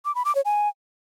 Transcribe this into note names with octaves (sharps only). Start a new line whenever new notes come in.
D6
B5
D6
C#5
G#5